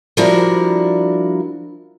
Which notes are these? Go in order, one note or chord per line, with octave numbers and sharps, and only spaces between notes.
F3 G3 D4 E4 F#4 A#4